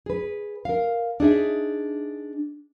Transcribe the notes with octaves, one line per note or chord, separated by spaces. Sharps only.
G#4 B4
A#4 F5
D4 D#4 G#4 E5